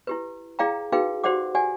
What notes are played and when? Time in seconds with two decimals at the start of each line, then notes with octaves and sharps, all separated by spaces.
0.07 E4 G4 B4
0.59 E4 G#4 D5 F5 G5 A#5
0.92 D#4 F#4 G#4 B4 F5 G5
1.24 F#4 G4 C5 D5 F#5 D6
1.55 G4 D5 F#5 G#5